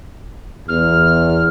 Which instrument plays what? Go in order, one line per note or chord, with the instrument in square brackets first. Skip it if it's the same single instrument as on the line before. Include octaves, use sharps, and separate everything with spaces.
[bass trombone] E2 [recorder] F6